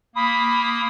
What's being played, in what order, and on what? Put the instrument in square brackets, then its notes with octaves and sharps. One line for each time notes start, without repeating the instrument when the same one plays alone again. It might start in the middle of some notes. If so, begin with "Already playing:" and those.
[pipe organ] A#3 D#6 [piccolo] B5